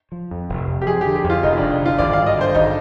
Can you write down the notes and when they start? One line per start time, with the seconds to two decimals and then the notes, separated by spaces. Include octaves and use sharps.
0.12 F3
0.31 F2
0.49 F1
0.68 F2
0.82 G4
0.87 F3 G#4
1.01 D3 G4
1.16 G4
1.24 F2
1.30 F4
1.43 F1 D#4
1.57 F1 D4
1.80 D3
1.85 F4
1.98 G#1 D5
2.13 G2 F5
2.27 D#5
2.37 D3 C5
2.55 G#1 D#4